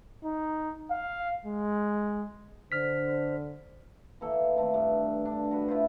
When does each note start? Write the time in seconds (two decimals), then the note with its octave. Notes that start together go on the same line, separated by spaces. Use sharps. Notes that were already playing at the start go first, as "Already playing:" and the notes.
0.25 D#4
0.91 F5
1.46 G#3
2.72 D3 C5 F6 B6
4.21 E3 A#3 A4
4.56 D#3 A3 C4
4.74 G2
5.25 D4
5.51 F#4 A4 B4
5.68 E4 F4 C5